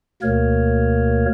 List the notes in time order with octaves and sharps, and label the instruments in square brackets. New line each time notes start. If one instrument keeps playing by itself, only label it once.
[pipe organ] D2 B2 A#3 A#4 C#5